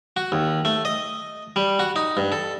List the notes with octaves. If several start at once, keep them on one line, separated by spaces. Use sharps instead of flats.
F#4
D#2
A3
D#5
G3
F#4
D#4
G2
A4